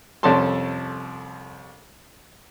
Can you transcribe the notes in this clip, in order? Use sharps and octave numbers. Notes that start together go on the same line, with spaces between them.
C2 F2 C#4 A4 A5 C6